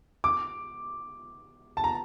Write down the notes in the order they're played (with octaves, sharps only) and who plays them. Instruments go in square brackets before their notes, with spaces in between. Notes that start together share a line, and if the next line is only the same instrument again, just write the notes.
[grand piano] D6
A5
A#5